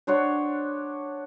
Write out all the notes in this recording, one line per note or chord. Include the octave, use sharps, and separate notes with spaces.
D4 C5 C#5 F#5